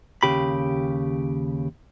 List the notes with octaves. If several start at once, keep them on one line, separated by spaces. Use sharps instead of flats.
D#2 C#3 G4 B5